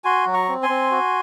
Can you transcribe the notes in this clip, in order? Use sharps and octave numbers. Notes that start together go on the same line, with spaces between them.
F#4 G#5 C6
F#3
A#5 C#6
C4
G#5 C6
C4
F#4